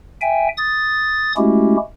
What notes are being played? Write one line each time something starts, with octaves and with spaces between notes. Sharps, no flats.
E5 G5 G#5
D#6 A6
G#3 A3 C#4 E4 F#4 G4